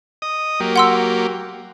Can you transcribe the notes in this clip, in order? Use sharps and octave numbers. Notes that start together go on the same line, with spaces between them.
D#5 D#6
F#3 A#3 G4
F#5 C6 E6